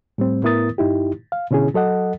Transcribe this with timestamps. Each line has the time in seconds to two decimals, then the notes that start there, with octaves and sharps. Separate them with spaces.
0.18 A2 G3 C4
0.43 A2 B3 E4 A#4 D#6 A6
0.78 G2 D#4 E4 G4
1.32 F5
1.51 B2 D3 C#4 E4 G#4
1.74 F#3 A4 D#5 F#5